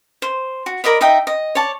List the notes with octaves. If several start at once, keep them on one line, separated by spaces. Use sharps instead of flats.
C5
F#4
A#4 D5 D#5 B5
D#4 D#5 E5 G5
D#5
C#5 D5 A5